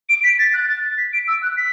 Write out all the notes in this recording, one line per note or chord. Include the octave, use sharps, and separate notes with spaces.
D7
B6
A6
F#6
A6
B6
D7
E6
F#6
B6